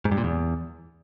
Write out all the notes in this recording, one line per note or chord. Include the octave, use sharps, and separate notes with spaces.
G#2
G2
A#2
E2